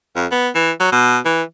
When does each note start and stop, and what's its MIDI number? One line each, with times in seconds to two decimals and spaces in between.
0.16 0.27 41
0.32 0.49 59
0.55 0.71 52
0.80 0.90 54
0.92 1.18 47
1.25 1.42 52